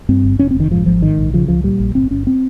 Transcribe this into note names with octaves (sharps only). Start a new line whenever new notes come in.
G2 C4
G1
F1 C#4
C4
F1
D#3
G#2 F3
G#1 F3
G#2 D#3
A#1
C#3 F3
C#2 F3
A#2 G3
A#1
G1 C4
G1 C#4
C4